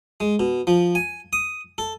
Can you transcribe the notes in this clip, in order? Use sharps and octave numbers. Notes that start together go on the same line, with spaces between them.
G#3
B2
F3
G#5
D#6
A4